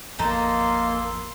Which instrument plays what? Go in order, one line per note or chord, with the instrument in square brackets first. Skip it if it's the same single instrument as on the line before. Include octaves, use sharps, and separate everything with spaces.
[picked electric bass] G#1 E2 F3 [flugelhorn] A#3 [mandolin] D#4 A4 A#5 [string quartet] C6